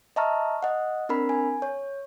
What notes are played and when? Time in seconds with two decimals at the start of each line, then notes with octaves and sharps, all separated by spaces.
0.16 D#5 E5 A5 A#5 C#6 F6
0.63 D#5 F#5
1.09 C4 D4 A#4 B5
1.29 G#5
1.62 C#5